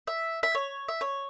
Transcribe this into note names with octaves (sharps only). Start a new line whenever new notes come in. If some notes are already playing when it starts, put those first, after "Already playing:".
E5
E5
C#5
E5
C#5